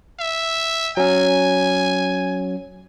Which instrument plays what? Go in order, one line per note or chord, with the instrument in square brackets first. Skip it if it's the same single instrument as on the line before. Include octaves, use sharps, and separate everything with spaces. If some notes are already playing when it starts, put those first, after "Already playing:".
[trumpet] E5
[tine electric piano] F#3 C#4 [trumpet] G#5